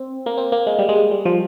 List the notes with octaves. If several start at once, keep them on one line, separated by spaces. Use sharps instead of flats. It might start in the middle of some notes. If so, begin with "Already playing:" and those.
Already playing: C4
A#3
C4
A#3
G#3
G3
G#3
G3
F3